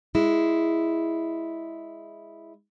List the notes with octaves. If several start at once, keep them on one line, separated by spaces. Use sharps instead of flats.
G#3 E4